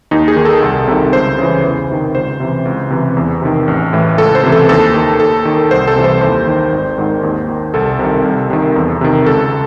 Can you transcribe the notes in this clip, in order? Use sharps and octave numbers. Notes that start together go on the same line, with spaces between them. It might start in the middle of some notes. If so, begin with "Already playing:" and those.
D#2 D#4
G#4
D#3
A4
C2
C3 D#3
C#2 C5
C#3 E3
E2
C3 D#3
C#2 C5
C3 E3
C#2
C3 E3
E2
C3 D#3
A1
A2 E3
C#2 A4
C5
C3 E3
A4
D#2 A4
D#3
D#2 A4
D#3
C2 C5
A4
C3 E3
C5
D#2 C5
D#3
G#1
G#2 D#3
D#2
D#3
C2 A4
C3 D#3
C2
C3 D#3
E2
C3 D#3
C#2 A4